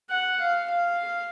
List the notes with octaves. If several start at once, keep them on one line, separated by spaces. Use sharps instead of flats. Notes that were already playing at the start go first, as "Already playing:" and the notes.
F#5
F5
F5